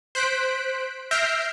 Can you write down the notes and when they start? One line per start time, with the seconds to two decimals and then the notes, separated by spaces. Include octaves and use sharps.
0.15 C5 F#6 B6 D7
1.11 E5 F6 G6 A#6 C7 D7